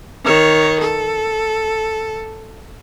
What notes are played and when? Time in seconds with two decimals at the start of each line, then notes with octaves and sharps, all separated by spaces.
0.25 D#3 C#5
0.81 A4